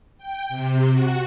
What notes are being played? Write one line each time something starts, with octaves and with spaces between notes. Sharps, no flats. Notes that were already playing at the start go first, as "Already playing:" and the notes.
G5
C3
F#4